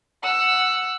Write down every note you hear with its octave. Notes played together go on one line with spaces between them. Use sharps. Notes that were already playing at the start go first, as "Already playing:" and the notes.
F#5 E6